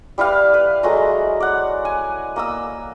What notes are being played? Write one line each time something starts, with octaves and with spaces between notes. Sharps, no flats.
G3 E4 B4 F5
B4
F#3 G#3 A3 A#5
D5 F#5
G#5
A#3 D#6 E6